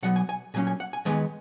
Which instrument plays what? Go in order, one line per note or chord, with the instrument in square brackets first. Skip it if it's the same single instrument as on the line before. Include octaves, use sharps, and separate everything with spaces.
[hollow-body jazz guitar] B2 F#3 B3 F#5
G#5
G#5
A#2 F#3 A#3 C#4 G#5
G#5
F#5
G#5
D#2 D#3 G#3 B3 G#5